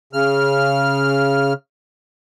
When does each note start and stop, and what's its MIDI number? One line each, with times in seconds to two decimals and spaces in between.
0.13 1.53 49
0.13 1.53 89